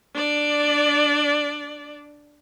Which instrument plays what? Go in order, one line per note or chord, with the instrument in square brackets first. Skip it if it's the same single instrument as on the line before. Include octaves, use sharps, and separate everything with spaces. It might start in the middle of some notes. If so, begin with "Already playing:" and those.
[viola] D4 D5